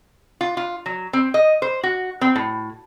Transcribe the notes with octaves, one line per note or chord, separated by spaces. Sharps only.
F4
F4
F#3
C4
D#5
C5
F#4
C4
A2